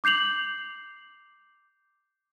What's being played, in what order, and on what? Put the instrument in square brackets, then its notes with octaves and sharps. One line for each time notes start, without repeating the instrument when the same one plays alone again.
[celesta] D6 G6 C7 F7 F#7